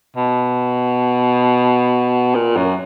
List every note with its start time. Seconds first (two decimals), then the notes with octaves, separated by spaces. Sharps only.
0.16 B2
2.35 A#2
2.57 F#2